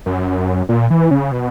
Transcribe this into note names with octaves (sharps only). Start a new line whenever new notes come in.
F#2
A#2
E3
C#3
B2